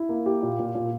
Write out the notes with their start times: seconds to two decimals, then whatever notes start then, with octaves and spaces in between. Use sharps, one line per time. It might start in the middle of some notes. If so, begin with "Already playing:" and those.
Already playing: E4
0.09 A#3
0.26 G4
0.43 A#2
0.59 A#2
0.75 A#2